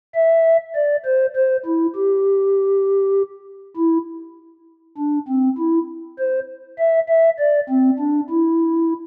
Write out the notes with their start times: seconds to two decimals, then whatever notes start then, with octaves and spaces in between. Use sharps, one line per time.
0.14 E5
0.75 D5
1.05 C5
1.35 C5
1.65 E4
1.95 G4
3.77 E4
4.98 D4
5.28 C4
5.58 E4
6.18 C5
6.78 E5
7.08 E5
7.39 D5
7.69 C4
7.99 D4
8.30 E4